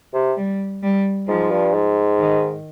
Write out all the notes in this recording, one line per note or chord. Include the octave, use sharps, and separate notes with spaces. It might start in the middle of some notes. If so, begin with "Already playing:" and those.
C3
G3
G3
G#2 F3
G2
G#2
D#3